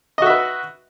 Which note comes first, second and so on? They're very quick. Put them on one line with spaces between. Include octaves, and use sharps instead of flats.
D#5 F#4 E5 B4